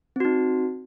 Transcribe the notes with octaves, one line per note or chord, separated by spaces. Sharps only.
C4 D#4 F#4